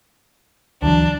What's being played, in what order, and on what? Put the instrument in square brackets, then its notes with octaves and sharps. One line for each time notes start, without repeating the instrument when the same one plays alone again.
[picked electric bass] D2 E3 F#3 [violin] D4